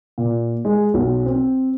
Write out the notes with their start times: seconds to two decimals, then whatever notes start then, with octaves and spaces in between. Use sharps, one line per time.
0.18 A#2
0.65 G#3
0.94 B1
1.26 C4